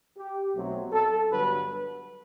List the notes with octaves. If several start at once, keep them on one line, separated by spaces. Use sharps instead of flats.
G4
B1 B2 F#3 A3 C4
A4
G2 D3 F#3 B3 B4